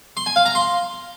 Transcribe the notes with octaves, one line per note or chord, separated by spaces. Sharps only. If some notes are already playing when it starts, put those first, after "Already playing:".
C6
G#5
F5
A#5
C6